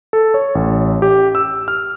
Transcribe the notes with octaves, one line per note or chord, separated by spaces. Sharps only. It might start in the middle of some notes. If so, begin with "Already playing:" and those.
A4
C#5
A1
G4
E6
F6